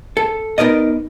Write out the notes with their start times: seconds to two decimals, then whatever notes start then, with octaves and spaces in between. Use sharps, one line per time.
0.17 A4
0.58 B3 D#4 A#4 D5 D#5